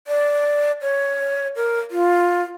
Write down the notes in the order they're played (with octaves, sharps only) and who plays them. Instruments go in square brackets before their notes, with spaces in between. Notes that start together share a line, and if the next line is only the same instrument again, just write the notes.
[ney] D5
C#5
A#4
F4